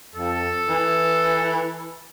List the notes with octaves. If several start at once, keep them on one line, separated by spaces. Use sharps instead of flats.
F2 A4
E3